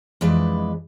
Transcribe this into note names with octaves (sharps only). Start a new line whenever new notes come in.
F2 E3 G#3 D4 B4 D#5